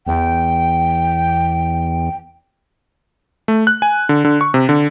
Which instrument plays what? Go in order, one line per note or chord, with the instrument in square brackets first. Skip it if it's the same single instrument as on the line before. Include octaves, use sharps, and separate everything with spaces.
[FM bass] E2 [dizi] G5
[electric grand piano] A3
F#6
G#5
D3
D3
C#6
C3
D3